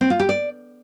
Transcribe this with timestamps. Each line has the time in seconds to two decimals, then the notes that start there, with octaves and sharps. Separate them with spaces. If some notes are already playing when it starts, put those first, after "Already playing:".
0.01 C4
0.10 F4
0.20 G4
0.29 D5